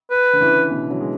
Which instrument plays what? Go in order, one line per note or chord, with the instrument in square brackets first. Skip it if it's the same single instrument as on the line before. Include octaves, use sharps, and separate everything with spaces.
[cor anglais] B4
[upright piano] D3
C#3 E3
B2 D3
D3 F#3
G#3